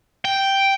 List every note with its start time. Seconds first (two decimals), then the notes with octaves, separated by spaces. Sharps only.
0.25 G5